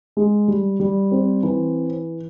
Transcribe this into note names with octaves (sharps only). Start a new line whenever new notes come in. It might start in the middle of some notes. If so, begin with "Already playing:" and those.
G#3
G3
G3
C4
E3